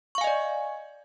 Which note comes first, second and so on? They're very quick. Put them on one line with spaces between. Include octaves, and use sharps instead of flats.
C#6 F5 G#5 D#5 D5